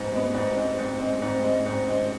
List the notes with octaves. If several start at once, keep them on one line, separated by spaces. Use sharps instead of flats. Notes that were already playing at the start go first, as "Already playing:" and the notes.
Already playing: G#2 B3
G#3 B3
G#2
G#3 C4
G#2
G#3 C4
G#2
G#3 C4
G#2
G#3 C4